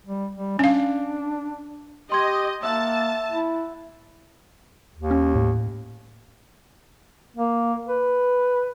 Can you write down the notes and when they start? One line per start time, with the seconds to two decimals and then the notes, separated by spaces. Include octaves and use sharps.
0.07 G3
0.36 G3
0.59 C#4 D4 F5
2.12 G4 D#5 C6 G#6
2.63 A#3 E5 F#5 A5
3.32 E4
4.96 D#2
5.11 C#4
5.35 A2
7.37 A#3
7.88 B4